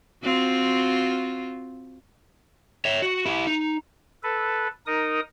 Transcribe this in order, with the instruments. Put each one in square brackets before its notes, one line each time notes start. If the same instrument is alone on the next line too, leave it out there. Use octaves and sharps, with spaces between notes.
[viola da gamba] C4 F4 F#4
[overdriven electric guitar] C#5 E5
F#4
E4 G4
D#4
[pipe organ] A4 B4
D#4 A#4 D#6